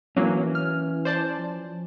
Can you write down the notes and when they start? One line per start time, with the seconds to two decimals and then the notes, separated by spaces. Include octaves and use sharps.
0.17 E3 F#3 A#3 C#4
0.55 F6
1.05 C5 D5 A5
1.38 F3